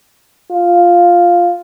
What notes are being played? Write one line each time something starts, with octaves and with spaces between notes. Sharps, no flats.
F4